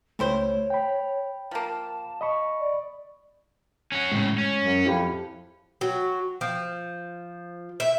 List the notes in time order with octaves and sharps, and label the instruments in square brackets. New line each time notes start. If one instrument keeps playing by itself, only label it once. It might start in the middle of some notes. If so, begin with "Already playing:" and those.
[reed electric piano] C#2 A3 [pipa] G3 E4 C5 [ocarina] C#5
[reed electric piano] G5 B5
[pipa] F3 A#3 [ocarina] A5
[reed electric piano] D#5 B5 C#6
[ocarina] D5
[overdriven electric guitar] C#4 F#4
[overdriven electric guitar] A2 C#3 [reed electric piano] G#3
[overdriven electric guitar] C#4
[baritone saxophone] F#2
[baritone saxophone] F2 [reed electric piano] E4 G4 B5
[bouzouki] F#3
F3
E5